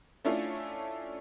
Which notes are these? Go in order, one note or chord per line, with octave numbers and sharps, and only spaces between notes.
A3 C#4 D4 E4 F4 A4